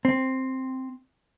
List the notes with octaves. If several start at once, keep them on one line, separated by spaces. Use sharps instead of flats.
C4